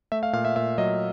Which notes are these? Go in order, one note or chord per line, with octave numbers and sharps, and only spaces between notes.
A3 E5
F5
A#2 F5
E5
A#2 E5
F#3 D#5